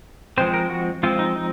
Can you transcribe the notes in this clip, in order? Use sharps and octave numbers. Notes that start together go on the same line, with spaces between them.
F3 G#3 C4 C5
A#4
F#4
F3 G#3 C4 F4
D#4
D#4